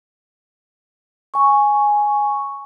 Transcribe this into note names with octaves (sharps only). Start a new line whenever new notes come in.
G#5 C#6